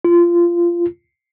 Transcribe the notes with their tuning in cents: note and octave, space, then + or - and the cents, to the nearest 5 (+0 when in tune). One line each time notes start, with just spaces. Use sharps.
F4 -20